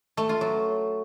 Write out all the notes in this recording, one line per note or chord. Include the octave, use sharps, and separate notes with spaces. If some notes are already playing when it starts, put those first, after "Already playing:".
A3
F4
F#3